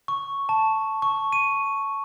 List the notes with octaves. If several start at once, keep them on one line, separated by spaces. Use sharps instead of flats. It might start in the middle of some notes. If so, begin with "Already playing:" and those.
C#6
A5
C#6
D#7